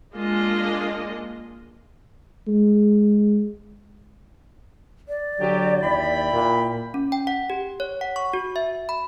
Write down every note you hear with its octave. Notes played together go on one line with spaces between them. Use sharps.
G#3 A#3 D4 F4 D#5
G#3
D5
D3 F#3 G4
D#2 E4 G5 B5
A#2
C#4
G5
F#5
G4
C#5
F#5
C#6
F#4
E5
B5